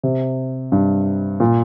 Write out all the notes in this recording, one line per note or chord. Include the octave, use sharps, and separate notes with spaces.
C3
G2
A#2